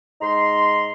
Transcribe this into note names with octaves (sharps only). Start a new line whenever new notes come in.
G#2 D#4 A#5 C6